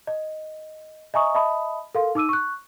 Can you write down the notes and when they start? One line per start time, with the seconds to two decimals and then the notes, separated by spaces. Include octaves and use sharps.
0.07 D#5
1.14 D#5 E5 G#5 A#5 C#6 D#6
1.35 D#5 E5 A5 B5 D#6
1.95 A4 A#4 F5 C6
2.15 D#4 D6 E6 D#7
2.29 C#6 F#6